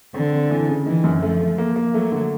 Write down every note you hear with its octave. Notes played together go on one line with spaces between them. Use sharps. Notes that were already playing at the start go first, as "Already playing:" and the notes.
D3 C4
C4
E3
C#3
D#3 E3
F#2
F3 A3
A3
A#3
A#3
F#3 A3
D3